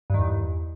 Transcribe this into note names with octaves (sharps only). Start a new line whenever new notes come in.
E2 G2 D#3